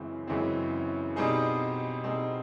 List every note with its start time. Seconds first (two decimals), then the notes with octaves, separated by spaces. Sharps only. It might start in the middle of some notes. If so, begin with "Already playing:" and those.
Already playing: F#2 C#3 E3 G#3 C4
0.27 F#2 C#3 E3 G#3 C4
1.16 B2 G3 C4 D#4 G#4
2.04 B2 G3 C4 D#4 G#4